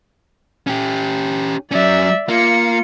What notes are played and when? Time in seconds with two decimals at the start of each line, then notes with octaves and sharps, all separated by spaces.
0.67 C#4 G4
1.71 F#3 C#4 D5 E5
2.29 A#3 F4 C#7